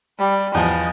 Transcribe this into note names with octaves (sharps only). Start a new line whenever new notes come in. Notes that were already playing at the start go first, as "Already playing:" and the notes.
G3
E2 F3 D#5